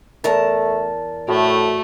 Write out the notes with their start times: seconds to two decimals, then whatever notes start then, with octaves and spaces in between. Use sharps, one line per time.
0.24 E2 A3 A#4 A5 A6
1.28 A2 A3 F#4